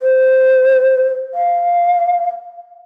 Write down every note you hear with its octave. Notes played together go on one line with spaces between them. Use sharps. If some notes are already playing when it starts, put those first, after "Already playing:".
C5
F5